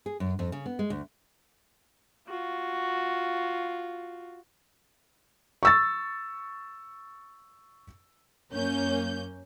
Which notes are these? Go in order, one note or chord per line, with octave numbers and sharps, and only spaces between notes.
G#4
F#2
F2
C#3
B3
G#3
D2
F4 F#4
C#6 E6 A6
F#2 A#3 C#4 G6